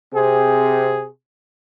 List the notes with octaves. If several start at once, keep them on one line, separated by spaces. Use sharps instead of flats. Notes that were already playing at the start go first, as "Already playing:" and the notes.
C3 C4 G#4